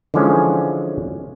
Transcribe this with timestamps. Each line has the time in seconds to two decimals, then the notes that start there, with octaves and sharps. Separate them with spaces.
0.14 D3 E3 F3 G#3 C#4